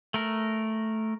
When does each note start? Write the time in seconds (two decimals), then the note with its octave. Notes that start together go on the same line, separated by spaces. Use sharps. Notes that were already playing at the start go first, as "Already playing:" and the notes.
0.14 A3 A#4